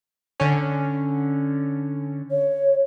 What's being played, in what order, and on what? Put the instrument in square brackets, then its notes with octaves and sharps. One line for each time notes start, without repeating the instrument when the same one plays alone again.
[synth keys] D3 C#4
[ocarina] C#5